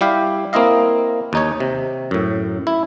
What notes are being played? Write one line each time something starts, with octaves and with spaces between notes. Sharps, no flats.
G3 E4 G4 F5
A#3 C4 E4 D#5 F5
D#2 D#4 C#5
C3
F#2 A2
E4